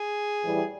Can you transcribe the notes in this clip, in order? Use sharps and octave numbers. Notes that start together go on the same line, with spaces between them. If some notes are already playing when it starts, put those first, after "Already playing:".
Already playing: G#4
A2 E3 G3